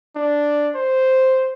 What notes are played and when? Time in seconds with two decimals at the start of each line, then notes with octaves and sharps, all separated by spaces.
0.16 D4
0.76 C5